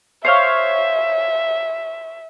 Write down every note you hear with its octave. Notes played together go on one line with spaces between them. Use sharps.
C5 C#5 E5 F5